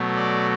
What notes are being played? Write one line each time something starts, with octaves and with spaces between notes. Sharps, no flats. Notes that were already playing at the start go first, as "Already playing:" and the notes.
Already playing: B2 F#3 A3
D5